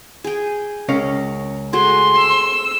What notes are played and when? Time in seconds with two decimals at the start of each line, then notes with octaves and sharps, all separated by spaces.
0.24 G#4 G5
0.89 C#2 C#4 A#4 F5
1.73 A3 F#4 G#4 C6
2.18 E6